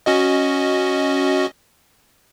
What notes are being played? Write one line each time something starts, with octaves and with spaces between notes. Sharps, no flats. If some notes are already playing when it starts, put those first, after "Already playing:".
C#4 F#4 D#5